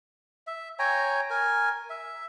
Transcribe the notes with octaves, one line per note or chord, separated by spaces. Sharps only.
E5
C#5 G5 G#5 A#5
A#4 G#5
E5